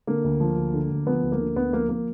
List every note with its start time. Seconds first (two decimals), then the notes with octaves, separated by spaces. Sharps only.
0.07 D3 A#3
0.24 D2
0.40 F3
0.57 D2
0.74 D3
0.90 D2
1.06 F3 B3
1.23 D2
1.32 A#3
1.40 D3
1.56 D2 B3
1.73 F3 A#3
1.89 A#3